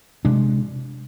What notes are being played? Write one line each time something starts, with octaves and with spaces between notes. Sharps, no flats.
C3 G#3 D4